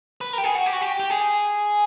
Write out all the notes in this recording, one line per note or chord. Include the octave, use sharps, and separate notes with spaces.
B4
A#4
G4
G#4
F#4
G4
F#4
G4
G4
G#4